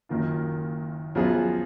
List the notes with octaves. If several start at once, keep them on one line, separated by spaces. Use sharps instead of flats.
F#1 F#2 D#3 A#3 F4
F#2 F3 B3 F4 G#4